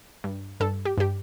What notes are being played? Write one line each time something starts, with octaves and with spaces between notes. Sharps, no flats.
G2
G2 A4
G4
G2 G4